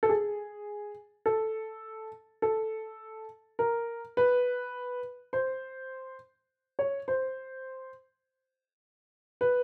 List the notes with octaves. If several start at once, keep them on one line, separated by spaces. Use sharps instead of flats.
A4
G#4
A4
A4
A#4
B4
C5
C#5
C5
B4